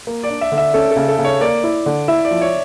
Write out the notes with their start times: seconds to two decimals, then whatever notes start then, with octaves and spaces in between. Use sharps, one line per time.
0.07 A#3
0.23 D5
0.30 D4
0.41 E5
0.52 D3
0.58 E5
0.74 C#4 A4
0.91 A4
0.96 C#3
1.08 A4
1.19 C#3
1.24 C#5
1.41 A#3 D5
1.64 E4
1.86 D3
2.08 E4 E5
2.25 D5
2.31 F3
2.41 C#5